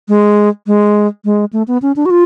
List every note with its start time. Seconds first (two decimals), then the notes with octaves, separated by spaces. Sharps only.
0.08 G#3
0.67 G#3
1.25 G#3
1.53 A3
1.68 B3
1.82 C#4
1.96 D4
2.06 F#4
2.11 F4